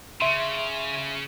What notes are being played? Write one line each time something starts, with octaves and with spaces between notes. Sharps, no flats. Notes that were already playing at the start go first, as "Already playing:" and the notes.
C#3 E5 C6